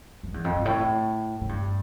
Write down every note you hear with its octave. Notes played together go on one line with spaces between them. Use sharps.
F2
E2
F2
G2
A2
A2
G2